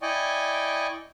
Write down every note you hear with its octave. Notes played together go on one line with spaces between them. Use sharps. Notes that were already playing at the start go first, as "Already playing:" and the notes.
E4 D5 D#5 G5 G#5 C#6